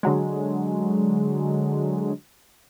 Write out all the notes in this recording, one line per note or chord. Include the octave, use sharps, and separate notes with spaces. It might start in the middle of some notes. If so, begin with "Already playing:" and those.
D3 F#3 G#3